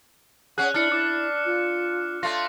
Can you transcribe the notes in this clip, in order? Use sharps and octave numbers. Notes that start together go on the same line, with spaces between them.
C#4 G#4 F#5 F#6
D4 E4 F6 C#7
E4 D6
F4
A3 F4 A#6